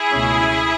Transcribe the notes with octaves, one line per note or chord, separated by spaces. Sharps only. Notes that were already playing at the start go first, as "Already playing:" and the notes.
Already playing: E4 G#4
C#2 B2 A3 C#4